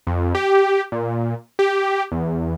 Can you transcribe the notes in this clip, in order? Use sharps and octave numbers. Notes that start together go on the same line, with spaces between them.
F2
G4
A#2
G4
E2